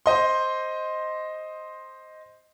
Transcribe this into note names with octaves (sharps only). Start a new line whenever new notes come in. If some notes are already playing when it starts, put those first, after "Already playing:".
C5 D#5 C6